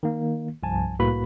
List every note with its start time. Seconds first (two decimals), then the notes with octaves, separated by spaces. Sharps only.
0.03 D#3 A#3
0.63 C2 G2 F3 G#5 A5
1.00 C2 A2 A#3 F#4 B4 B5